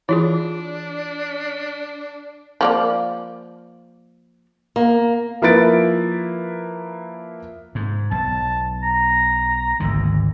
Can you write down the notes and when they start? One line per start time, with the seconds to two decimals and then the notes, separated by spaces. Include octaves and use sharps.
0.09 E3 D4 E4 F4 G#4
2.61 F3 A#3 D5
4.76 A#3
5.42 F3 A#3 E4 B4 A6 D7
7.75 G#2
8.11 B1 A5
8.83 A#5
9.80 G#1 D2 D3